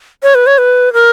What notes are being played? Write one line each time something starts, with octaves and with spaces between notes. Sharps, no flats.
C#5
B4
C#5
B4
A#4